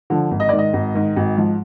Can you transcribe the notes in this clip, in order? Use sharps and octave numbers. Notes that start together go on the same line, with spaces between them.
D3 F3
G#1
D#5
G#2 D#3 D5
D#5
G#1
G#2 D#3
G#1
G#2 F3